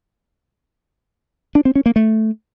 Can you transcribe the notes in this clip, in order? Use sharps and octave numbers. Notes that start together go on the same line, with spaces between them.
D4
C4
C#4
A#3
A3